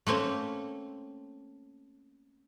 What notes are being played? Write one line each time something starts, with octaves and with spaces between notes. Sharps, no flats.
A3 A#3 C4 C#4